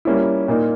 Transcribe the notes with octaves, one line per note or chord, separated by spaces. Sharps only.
G3 A#3 C#4 E4
A#2 A#3 D#4